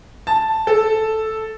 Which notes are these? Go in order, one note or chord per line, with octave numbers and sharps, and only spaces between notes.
A5
A4